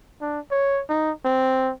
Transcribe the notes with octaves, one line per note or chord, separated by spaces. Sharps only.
D4
C#5
D#4
C4